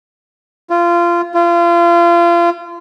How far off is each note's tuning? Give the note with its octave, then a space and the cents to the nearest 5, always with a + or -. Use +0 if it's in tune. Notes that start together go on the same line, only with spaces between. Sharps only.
F4 -20
F4 -30